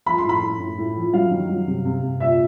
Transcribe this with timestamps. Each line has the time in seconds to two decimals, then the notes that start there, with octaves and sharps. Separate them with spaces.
0.06 F3 B5
0.18 C6
0.25 A2 B5
0.42 A2
0.60 A2
0.78 A2
0.96 F3
1.13 F#3 F5
1.31 D#3
1.49 F#3
1.67 C3
1.85 C3
2.02 C3
2.20 A#2 E5